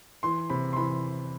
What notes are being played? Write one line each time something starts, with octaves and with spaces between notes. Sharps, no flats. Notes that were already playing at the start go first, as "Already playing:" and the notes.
E3 C6
C3 B5
C6
E3 B5